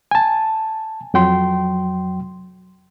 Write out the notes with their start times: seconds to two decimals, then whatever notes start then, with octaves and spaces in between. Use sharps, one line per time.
0.11 G#5 A5
1.14 F2 F#3 G5 C6